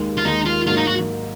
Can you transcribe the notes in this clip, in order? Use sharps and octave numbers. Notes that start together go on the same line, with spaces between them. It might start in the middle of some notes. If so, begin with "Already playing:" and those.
Already playing: D#2 D#3 G#3
F4
D#2 D#3 G#3 D#4
F4
G#2 F#3 A#3 F4
D#4
F#4